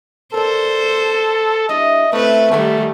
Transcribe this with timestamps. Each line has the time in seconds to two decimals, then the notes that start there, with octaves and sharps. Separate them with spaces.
0.34 A4 A#4 C5 D5
1.69 G3 D4 E4 D#5
2.13 A3 C4 E4 B4 C5
2.52 D#3 G3 A3 G4 F#5 G#5